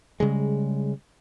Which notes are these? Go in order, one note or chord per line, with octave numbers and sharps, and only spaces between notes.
C#3 G3 G#3